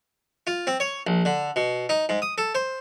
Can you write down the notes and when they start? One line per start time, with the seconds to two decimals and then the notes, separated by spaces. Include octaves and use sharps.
0.47 F4
0.67 C4
0.80 C#5
1.07 A#1
1.25 D3
1.56 B2
1.89 D#4
2.09 G#2
2.22 D#6
2.38 A4
2.55 C5